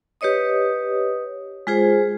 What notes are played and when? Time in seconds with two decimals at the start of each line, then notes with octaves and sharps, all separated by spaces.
0.21 G4 B4 C#5 D#5 D#6
1.67 G#3 F4 G#4 C5